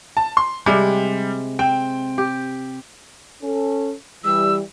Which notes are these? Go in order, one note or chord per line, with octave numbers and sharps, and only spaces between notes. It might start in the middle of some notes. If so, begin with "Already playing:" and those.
A5
C6
C3 G3 G#3
C4 G5
G4
C#4 A4
E3 G3 E6